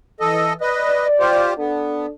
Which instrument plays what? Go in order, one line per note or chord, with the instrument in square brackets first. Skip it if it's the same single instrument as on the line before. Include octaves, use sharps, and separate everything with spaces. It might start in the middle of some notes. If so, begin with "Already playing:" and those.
[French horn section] E3 [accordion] A4 D#5
[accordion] B4 D#5 [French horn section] D5
[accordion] F4 G4 C5
[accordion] B3 [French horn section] D4 A4